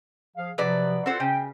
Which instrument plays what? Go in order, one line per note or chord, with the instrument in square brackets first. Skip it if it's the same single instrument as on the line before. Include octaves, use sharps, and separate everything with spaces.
[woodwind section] F3 G#4 F5
[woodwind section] C3 F3 [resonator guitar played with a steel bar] F#3 B4 D5
[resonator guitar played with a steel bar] C4 C5 [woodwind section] F4 A4 F#5
[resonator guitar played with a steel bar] C#3 [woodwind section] G5